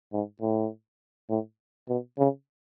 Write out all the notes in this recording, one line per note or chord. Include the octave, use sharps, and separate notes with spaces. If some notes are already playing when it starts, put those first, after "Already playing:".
G#2
A2
A2
B2
C#3